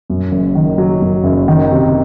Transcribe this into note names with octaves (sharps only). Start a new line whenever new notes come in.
F#2
F#1
D#3
F#3
F#2
F#1
D#3
C3